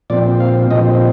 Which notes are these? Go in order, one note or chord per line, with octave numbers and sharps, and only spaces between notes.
A#2 F3 C4 D5
F5
A#2 F3 C4 D#5